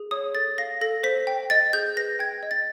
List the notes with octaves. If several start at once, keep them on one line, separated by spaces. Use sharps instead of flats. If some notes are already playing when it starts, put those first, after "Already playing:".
Already playing: G#4
C#5 D#6
A4 A6
F5 A#6
A4 A#6
C5 B6
G5
D#5 A6
G#4 G6
B4 A#6
G5 G#6
D#5
A6